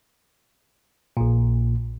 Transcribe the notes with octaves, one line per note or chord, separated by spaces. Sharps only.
A#1 A#2